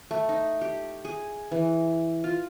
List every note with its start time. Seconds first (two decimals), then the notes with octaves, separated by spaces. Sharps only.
0.11 A3
0.29 D#4
0.61 G4
1.05 G#4
1.52 E3
2.24 F4